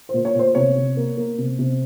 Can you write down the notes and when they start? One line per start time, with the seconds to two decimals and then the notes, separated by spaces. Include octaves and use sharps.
0.09 C5
0.14 A#2
0.25 C#5
0.35 A#2 C5
0.55 C3 C#5
0.75 C3
0.97 A#3
1.17 A#3
1.38 C3
1.59 C3